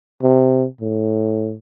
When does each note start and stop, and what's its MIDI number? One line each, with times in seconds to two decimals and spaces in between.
0.23 0.65 48
0.81 1.55 45